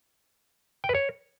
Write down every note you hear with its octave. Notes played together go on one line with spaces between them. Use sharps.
G5
B4
C#5